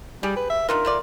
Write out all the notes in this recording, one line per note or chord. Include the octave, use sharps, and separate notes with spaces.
G3 G4 G#4
B4
E5
D4 D#4 F4 A#4
A3 F4 D5